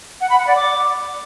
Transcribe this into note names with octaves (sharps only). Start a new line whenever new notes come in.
F#5
B5
F#5
D5
D6